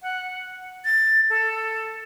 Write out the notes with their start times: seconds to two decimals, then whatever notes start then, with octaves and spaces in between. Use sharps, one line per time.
0.02 F#5
0.85 A6
1.30 A4